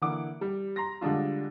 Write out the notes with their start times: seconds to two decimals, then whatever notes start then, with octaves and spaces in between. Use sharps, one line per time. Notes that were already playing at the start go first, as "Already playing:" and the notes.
0.02 D3 E3 A#3 F#5 D6
0.41 G3
0.76 A#5 C6 A#6
1.01 D3 G3 G#3 D4 F4